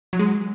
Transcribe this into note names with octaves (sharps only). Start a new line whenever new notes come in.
F#3
G#3